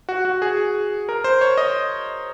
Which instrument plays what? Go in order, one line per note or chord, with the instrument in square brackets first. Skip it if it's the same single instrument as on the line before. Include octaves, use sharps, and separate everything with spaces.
[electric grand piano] F#4
F#4
G#4
A#4
C5
C#5
D#5